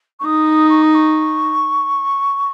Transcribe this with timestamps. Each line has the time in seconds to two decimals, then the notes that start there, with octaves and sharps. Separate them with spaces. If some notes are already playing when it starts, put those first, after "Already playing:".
0.19 C#6
0.25 D#4 D#6
0.69 C#6
0.82 D#6
0.94 C#6